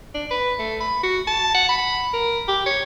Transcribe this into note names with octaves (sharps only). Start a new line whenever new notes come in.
D4
B4
A3
B5
F#4
A5
F#5
B5
A#4
G4
C#5